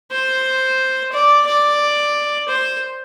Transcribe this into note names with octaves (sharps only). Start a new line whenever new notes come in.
C5
D5
D5
C5